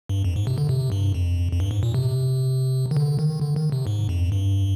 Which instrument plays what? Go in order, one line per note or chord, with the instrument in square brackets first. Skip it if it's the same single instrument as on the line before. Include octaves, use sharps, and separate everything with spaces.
[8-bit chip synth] G2
F2
G#2
C3
D3
C3
G2
F2
F2
G2
G#2
A#2
C3
D#3
D3
D#3
D3
D#3
C3
G#2
F2
G2